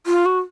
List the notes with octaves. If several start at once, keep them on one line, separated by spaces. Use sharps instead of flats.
F4
F#4